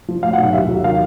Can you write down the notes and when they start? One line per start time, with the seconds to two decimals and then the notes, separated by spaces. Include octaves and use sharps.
0.08 F3
0.23 A2 F5
0.33 B1 F#5
0.43 F5
0.53 D#2 E5
0.68 F#3
0.84 D#3 F5